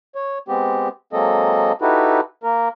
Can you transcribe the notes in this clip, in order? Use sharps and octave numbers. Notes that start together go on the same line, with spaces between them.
C#5
G#3 B3 C4 G4
F#3 G#3 A#3 C4 A4 D#5
D#4 E4 F#4 G4 A4 B4
A#3 A#4